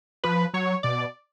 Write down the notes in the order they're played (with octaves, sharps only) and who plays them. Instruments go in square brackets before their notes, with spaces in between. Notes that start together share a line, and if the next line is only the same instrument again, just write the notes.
[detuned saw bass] F3 [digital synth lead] B4
[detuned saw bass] F#3 [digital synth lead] C#5
[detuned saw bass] B2 [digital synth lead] D5